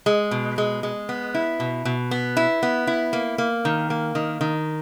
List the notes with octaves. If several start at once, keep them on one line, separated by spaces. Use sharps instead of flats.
G#3
B2
G#3
G#3
B3
E4
B2
B2
B3
E4
B3
E4
A#3
A#3
D#3
A#3
D#3
D#3